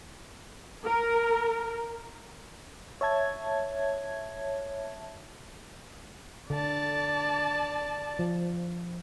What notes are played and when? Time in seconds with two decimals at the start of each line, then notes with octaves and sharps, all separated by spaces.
0.86 A#4
3.01 C#5 E5 A5 G#6
6.50 D3 D5 A5
8.19 F3